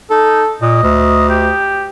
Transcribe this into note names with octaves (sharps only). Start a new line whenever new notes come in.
D#4 A4
A#2 D#5
D2
G4